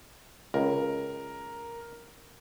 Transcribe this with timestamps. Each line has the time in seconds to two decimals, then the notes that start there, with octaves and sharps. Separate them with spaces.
0.54 C#2 A#4